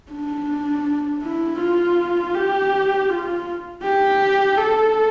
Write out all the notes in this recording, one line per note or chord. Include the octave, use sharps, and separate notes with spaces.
D4
E4
F4
G4
F4
G4
A4